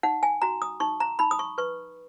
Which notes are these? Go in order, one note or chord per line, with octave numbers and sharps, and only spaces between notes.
D#4 F#5
G#5
F#4 A#5
D#6
D#4 C#6
A#5
D#4 B5
D#6
C#6
B4 C#6